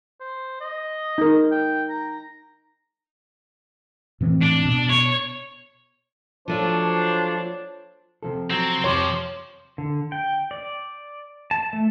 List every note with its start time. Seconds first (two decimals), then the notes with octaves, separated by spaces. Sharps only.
0.20 C5
0.61 D#5
1.18 D#4 A#4
1.51 G5
1.89 A#5
4.21 A2 E3 C4
4.41 D4
4.65 B2
4.90 C#5
6.48 F3 F#3 A3 D4 F4 C5 C#5
8.23 C3 F3 A4
8.50 F#3 C4
8.84 F2 C3 F3 G4 C5 C#5 C6 D6
9.78 D3
10.12 G5
10.51 D5
11.51 A5
11.73 A3